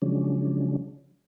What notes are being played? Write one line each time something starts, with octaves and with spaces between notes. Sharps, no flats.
C#3 F3 F#3 G#3 C#4 D4